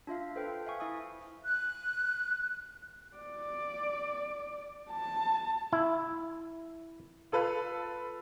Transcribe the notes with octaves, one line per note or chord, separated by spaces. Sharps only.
D4 F4 E5 F5
A4 B4 C5 F5 G5
E5 F5 G#5 C#6
E4 E5 G#5 D#6
F#6
D5
A5
E4
F4 A4 B4 F5